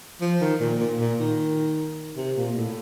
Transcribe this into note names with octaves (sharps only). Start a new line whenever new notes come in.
F3
D#3
A#2
A#2
A#2
D#3
C3
A#2
A2